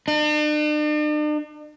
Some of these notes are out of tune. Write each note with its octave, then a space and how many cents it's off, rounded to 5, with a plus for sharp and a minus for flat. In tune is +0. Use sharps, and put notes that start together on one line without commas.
D4 +45